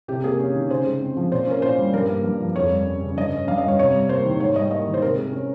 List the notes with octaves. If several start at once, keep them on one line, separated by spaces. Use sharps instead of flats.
C3 G4
A#3 G#4
C#4
D#3
C#3 C5
G#3
C4
F3
A#2 C5
C#4 A#4
A#2 C5
G3
G2 A#4
A#3
G2
F3
F2 C#5
G3
C#4
C#3
G2 D#5
C#4
G2 F5
D#5
G3 C#5
C3 C#5
G3
A#3 C5
D#3
G#2 C#5
G3 D#5
A#3 D#5
D#3
C5
C3 A#4
G#3
C#4